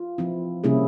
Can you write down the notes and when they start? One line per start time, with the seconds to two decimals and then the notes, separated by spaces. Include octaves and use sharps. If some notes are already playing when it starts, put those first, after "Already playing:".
Already playing: F4
0.18 F3 C4 E4
0.64 C3 G3 A#3 C#4 E4 G#4